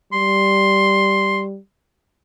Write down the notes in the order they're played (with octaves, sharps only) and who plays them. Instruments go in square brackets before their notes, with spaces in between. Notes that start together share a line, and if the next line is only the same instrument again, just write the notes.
[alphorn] G3 [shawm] C6